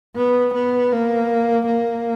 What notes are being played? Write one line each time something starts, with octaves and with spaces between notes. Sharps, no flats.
B3
B3
A#3
A#3